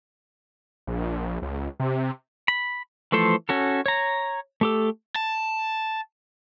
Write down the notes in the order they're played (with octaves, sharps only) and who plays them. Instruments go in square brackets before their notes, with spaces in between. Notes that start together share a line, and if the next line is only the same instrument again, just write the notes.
[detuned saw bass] A#1
C#2
C3
[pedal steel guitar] B5
E3 F3 A3 A4 C5
C#4 F#4 A4
C#5 A#5
A3 G4 A4
[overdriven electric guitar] A5